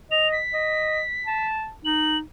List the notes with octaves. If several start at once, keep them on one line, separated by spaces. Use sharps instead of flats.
D#5 F7
B6
D#5
A5
D#4 F#7